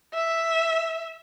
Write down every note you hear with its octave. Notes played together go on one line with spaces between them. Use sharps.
E5